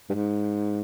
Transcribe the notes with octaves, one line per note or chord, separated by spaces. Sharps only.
G2
G#2